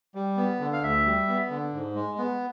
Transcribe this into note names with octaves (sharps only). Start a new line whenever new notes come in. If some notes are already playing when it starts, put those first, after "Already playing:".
G3
B3
D3
F5
D2 E5
G3
B3
D3
G#2
G#3
B3